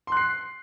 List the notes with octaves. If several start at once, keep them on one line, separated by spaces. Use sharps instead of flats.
C6 F#6 C7